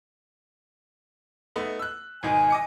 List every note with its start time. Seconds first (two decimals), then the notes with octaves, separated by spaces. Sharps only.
1.56 A3 B3 D#4
1.79 E6 F#6
2.23 G#1 B2 D#3 G#5
2.50 D#5 D6 C#7